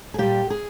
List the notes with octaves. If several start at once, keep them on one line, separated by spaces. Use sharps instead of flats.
G#4
A#2 G3 G4
G#4